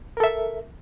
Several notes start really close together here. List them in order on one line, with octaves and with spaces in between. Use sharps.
A#4 A4 E5